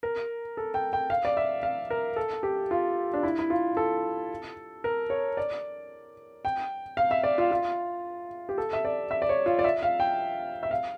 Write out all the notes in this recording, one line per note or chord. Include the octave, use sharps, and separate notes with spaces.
A#4
A4
G5
G5
F5
D5
E5
F5
A#4
A4
G4
F4
D4
E4
E4
F4
A4
A#4
C#5
D5
G5
F5
E5
D5
F4
F4
G4
A4
E5
D5
E5
D5
C#5
F4
D5
E5
F5
G5
E5
F5